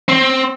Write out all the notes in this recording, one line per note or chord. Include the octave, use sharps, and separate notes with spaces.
C4